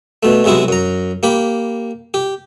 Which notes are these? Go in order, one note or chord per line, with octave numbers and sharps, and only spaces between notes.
B2 A3
B1 C3 G#3 E4 F#4
F#2 A#5
A#3 G4 B5
G4